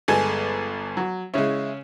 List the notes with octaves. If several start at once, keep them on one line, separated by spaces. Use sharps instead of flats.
G1 G#3 A4 G#5
F#3
C#3 G#3 C#4 E4